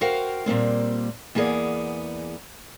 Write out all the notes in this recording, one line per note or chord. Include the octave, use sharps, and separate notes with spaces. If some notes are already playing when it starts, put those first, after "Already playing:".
F#4 A#4 C5 F5 G5
A#2 G3 A#3 C4
E2 A#3 B3 G#4 D5